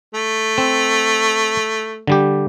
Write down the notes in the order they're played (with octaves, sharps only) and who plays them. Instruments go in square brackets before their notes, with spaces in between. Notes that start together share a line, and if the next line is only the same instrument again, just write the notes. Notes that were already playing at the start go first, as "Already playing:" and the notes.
[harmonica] A3
[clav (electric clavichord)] C4
D3 G3 G4